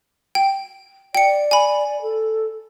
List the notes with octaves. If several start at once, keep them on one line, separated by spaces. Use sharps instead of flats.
G5
D5 G5 C#7
G#5 B5
A4